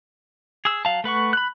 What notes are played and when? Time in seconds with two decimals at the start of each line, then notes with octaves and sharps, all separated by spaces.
0.65 G#4 E6
0.85 F#3 F5 A5
1.04 A3 B4 F#5 C#6
1.33 B5 F#6